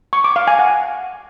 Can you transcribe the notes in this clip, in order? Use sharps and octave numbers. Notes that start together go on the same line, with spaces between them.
C#6
D6
F5
G#5
F#5